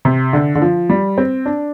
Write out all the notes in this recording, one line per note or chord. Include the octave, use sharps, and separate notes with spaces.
C3
D3
D3
F3
G3
C4
D4